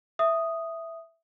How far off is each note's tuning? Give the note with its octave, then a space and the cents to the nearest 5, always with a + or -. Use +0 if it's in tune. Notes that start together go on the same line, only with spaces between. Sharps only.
E5 +0 D#6 +0